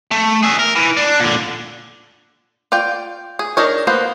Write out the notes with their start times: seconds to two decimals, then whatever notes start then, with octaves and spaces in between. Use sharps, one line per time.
0.11 A3
0.43 G#4 E5
0.59 A#4
0.76 E3
0.97 D4
1.20 A#2 D3
2.72 F4 D5 G5
3.39 G#4
3.57 D4 D#4 A#4 C#5
3.87 A#3 B3 C5